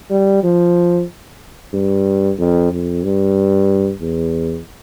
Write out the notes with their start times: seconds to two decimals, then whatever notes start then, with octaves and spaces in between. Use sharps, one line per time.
0.10 G3
0.43 F3
1.73 G2
2.38 F2
2.71 F2
3.04 G2
4.00 E2